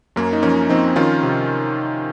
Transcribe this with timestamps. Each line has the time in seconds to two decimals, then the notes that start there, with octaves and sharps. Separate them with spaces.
0.16 F#2 A#3 C#4
0.33 D#4
0.43 F3 A#3 C#4
0.69 F3 C4 D#4
0.96 D#3 C#4 F4
1.23 C3